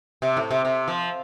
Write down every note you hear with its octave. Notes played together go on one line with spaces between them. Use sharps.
C3
A2
C3
C3
F3